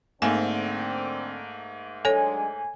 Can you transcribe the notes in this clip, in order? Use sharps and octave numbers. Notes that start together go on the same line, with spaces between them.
G#2 D3 A3 A#3 C4 G#5
F#3 G#3 D4 A4 C#5 G#5